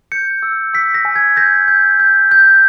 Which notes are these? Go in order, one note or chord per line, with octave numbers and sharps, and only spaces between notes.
G6 C#7
E6
E6 B6
A#6
G#5
G#6
G6 A#6
G6
G6
G6